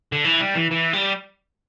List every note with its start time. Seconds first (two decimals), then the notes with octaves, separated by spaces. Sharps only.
0.12 D3
0.25 E3
0.40 G3
0.55 E3
0.71 E3
0.93 G3